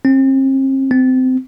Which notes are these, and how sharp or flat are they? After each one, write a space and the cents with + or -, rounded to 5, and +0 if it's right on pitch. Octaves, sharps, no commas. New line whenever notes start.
C4 +40
C4 -25